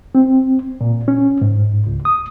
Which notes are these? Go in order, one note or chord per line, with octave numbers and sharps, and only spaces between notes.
C4
A#2
C#4
G#2
C#2
D#6